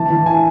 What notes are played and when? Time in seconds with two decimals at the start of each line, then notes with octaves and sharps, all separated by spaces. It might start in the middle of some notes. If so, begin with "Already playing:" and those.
Already playing: E3 A5
0.10 E3
0.26 G#5